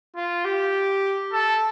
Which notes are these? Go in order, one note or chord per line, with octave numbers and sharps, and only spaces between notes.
F4
G4
A4